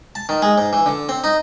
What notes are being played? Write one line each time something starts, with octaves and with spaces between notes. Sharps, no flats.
A5
D#3
G#3
G#2
E3
D3
C4
D#4